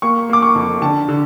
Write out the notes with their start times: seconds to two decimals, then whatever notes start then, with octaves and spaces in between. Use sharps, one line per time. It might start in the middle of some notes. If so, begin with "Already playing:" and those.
0.02 A#3 C#6
0.29 A#3 D6
0.42 C#6
0.55 F2
0.81 D3 A5
1.09 D3